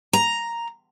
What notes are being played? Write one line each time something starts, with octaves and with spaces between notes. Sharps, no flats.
A#5